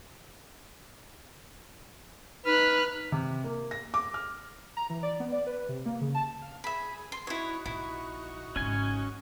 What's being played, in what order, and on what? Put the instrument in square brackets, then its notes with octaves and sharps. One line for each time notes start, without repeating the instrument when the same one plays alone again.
[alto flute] D#4 [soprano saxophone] B4 [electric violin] F6 F#6
[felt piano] C3
A#3
A#6
D6
F6
[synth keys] A#5
E3
D5
B3
D5
B4
C3
A#3
C#3
A5
[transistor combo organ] F5
[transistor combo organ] G#4 [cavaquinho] E5 B5
[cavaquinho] C6
[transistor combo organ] D#4 F#4 C#6 [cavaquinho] E4 C#5
[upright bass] A#1 [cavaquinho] E4
[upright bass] G#1 C#3 [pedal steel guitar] C#4 G#5